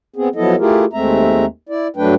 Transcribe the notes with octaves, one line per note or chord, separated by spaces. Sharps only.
B3 C4 G#4
F3 F#3 B3 E4 A4 D#5
A3 E4 F4 G4 G#4 A#4
D#2 G#3 A3 C4 E5 A#5
E4 D5
G2 F#3 A3 D4 B4 G5